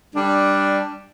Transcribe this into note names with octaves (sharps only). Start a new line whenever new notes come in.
G3 D4